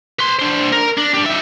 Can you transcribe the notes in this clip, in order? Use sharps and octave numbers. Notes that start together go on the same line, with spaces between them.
B4 C6
D4 C5
A#4
D4
D4 G4
D#4 E5